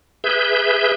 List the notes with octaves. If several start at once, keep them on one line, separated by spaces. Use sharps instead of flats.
G#4 B4 E5 G6